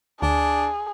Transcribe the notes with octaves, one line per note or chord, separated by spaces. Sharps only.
D2 D4 G#4